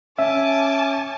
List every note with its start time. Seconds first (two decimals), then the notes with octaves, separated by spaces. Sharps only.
0.19 C#4 E5 G#5 A5 D6